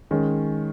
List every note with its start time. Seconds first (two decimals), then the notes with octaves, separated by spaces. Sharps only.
0.11 D#3 G#3 C#4